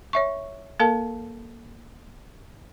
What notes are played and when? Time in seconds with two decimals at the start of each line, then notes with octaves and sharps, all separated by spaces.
0.13 C#5 E5 C#6
0.80 A#3 A4 A#4 F5 A5